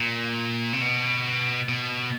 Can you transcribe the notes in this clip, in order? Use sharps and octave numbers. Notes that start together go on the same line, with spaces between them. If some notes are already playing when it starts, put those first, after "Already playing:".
Already playing: A#2
C3
B2
B2